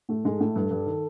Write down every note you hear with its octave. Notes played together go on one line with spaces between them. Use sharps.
A2 A3
G#2 G#3 A4
A2 A3
G2 G3
G2 G3
D#3